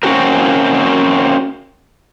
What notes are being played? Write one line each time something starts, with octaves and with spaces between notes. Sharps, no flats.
A#3 C4 C#4 F#4 G4 A#4